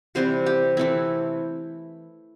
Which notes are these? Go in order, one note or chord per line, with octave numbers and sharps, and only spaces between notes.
C3 E3 G3 C4 C5
G4
E3 A3 C4 E4